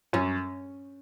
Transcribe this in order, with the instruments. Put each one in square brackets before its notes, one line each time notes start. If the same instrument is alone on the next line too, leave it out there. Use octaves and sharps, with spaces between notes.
[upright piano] F#2 [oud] C#4